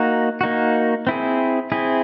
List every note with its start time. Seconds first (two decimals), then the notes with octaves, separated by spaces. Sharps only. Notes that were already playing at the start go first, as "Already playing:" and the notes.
Already playing: A#3 D#4 F#4
0.41 A#3 D#4 F#4
1.07 C4 E4 G#4
1.72 C4 E4 G#4